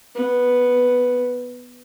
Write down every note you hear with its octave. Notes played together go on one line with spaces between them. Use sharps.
B3